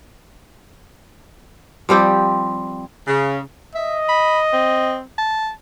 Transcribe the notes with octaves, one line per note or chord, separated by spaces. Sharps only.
F3 G3 C4 G4
C#3
D#5 E5
B5
C4
A5